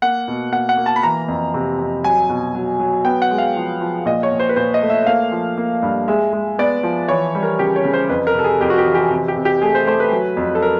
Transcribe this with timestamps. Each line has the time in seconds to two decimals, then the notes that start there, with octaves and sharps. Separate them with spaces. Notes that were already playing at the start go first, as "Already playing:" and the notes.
0.02 A#3 F#5
0.28 B2
0.52 A#3 F#5
0.69 F#5
0.77 A#3
0.86 A5
0.96 B5
1.03 E3 A#5
1.28 F2
1.54 C3
1.79 F2
2.04 F#3 G#5
2.29 B2
2.55 F#3
2.79 F#3
3.05 B3 G5
3.22 F#5
3.31 G#3
3.38 F5
3.56 F3
3.81 F3
4.06 A#2 D#5
4.23 C#5
4.32 A#2
4.40 C5
4.49 B4
4.56 A#2 C5
4.74 D#5
4.82 A3
4.90 E5
5.07 A#3 F5
5.32 F3
5.58 A#3
5.82 G2
6.08 G#3 E5
6.33 G#3
6.59 B3 D5
6.83 F3
7.08 E3 C#5
7.35 G3
7.43 A#4
7.59 C#3 G4
7.76 C#5
7.84 C#3
7.94 C5
8.09 F2 B4
8.27 A#4
8.35 C3 A4
8.44 G#4
8.60 F2 G4
8.70 F#4
8.78 G4
8.86 E3
8.95 G4
9.11 C3
9.28 G4
9.37 C3
9.45 G4
9.62 A3 G#4
9.75 C5
9.87 A3 C5
10.00 B4
10.11 F#3
10.37 F2
10.55 A4
10.62 A#4